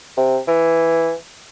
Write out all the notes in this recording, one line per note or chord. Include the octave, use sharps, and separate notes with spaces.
C3
E3